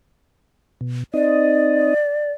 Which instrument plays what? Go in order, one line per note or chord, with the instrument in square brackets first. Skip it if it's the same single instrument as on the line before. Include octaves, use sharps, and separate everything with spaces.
[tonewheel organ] B2
[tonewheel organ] C4 D#4 D#5 [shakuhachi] D5